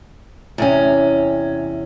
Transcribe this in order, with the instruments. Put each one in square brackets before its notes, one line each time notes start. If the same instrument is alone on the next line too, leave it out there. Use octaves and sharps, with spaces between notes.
[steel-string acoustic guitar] E2 C3 C#4